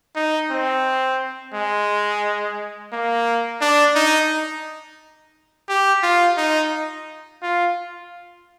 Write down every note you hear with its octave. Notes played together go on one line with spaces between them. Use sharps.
D#4
C4
G#3
A#3
D4
D#4
G4
F4
D#4
F4